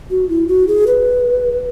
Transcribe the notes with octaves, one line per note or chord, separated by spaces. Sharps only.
F#4
E4
F#4
G#4
B4